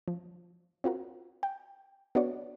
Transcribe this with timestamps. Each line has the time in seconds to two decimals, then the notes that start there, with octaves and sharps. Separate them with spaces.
0.08 F3
0.84 C4 F4 F#4 A#4
1.43 G5
2.15 B3 D4 F#4 C#5 D5